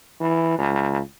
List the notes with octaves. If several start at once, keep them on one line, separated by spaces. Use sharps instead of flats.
E3
C#2